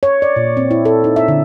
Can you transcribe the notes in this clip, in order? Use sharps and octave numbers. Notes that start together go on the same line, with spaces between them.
C#5
D5
A#2
C4
E4
A4
D#4
E5
D3